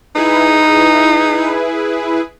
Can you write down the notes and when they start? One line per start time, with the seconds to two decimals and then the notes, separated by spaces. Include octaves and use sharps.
0.15 D#4 E4 G#4 B4